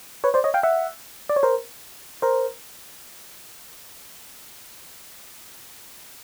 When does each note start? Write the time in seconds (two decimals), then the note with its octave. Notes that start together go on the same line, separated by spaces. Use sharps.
0.24 B4 C#5
0.34 C5 D5
0.44 C#5 D#5
0.54 F5 G5
0.63 E5 F#5
1.29 D5
1.36 C#5
1.43 A#4 C5
2.22 A#4 C5